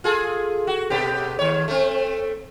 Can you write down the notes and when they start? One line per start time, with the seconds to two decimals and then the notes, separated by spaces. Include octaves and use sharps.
0.04 F4 G#4 A4
0.67 F#4
0.90 B2 B3 G4
1.39 D#2 C#5
1.68 A3 C4